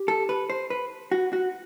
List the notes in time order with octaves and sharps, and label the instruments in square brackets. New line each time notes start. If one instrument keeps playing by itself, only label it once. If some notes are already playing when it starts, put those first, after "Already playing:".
Already playing: [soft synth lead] G4
[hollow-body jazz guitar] A4
B4
C5
B4
F#4
F#4